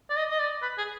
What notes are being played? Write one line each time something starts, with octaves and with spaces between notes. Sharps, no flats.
D5
D#5
D#5
D5
B4
G#4